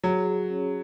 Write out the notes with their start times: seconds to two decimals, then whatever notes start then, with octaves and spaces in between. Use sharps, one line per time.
0.04 F#3 G#4
0.27 C#5
0.50 C#4